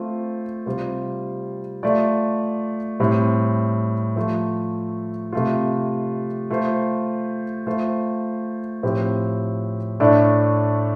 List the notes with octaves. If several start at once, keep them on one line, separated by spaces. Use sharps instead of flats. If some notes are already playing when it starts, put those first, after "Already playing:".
Already playing: A3 C4 F4 C5
C3 G3 F4 C5
A3 F4 D5
A2 G3 C4
F3 A3 F4
C3 A3 F4
A3 F4 C5
A3 F4 C5
A2 F3 C4 G4
A2 A3 D4 A4 D5